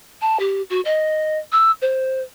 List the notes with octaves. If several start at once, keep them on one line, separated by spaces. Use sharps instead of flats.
A5
G4
F#4
D#5
E6
C5